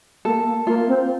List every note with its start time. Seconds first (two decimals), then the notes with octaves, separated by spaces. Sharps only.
0.25 A#3 A4
0.46 A#3
0.67 A#3 F4
0.88 C4